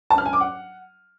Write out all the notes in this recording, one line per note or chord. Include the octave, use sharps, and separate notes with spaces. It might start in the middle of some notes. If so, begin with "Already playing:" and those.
A5
F6
G#5
D6
F#5